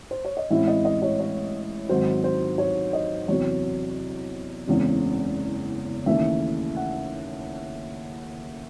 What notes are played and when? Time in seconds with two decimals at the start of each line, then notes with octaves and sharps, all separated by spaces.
0.11 C5
0.25 C#5
0.37 D#5
0.50 A1 A2 G#3 C4 E4 E5
0.67 D#5
0.85 D#5
1.02 C#5
1.20 C#5
1.89 G#2 D#3 F#3 C4 C5
2.24 C5
2.58 C#5
2.93 D#5
3.28 E2 C3 F#3 C#5
4.67 F#1 E2 C#3 G#3 C4
6.06 D#2 C#3 E3 A3 E5
6.76 F#5